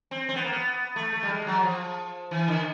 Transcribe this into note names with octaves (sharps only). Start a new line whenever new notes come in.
C4
C4
B3
A#3
B3
A3
A3
G3
G#3
G3
F#3
F3
E3
D3